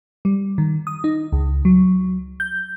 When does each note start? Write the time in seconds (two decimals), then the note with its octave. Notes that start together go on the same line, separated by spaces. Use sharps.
0.25 G3
0.58 D#3
0.87 D#6
1.04 D#4
1.32 C#2
1.65 F#3
2.40 G6